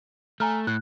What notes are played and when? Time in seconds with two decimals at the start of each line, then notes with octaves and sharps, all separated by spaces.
0.40 A3 G#5 A#5 F6
0.67 A2 F#6